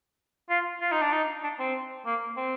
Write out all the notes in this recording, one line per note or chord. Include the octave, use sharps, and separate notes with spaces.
F4
F4
D#4
D4
D#4
D4
C4
A#3
C4